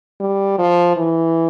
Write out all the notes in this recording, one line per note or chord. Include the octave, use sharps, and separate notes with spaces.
G3
F3
E3